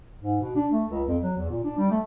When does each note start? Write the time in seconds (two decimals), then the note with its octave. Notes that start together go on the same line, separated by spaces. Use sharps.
0.22 G#2
0.41 B2
0.56 D4
0.73 A3
0.90 C#2
1.08 F2
1.23 F#3
1.37 E2
1.50 A#2
1.64 D4
1.78 G3
1.91 A3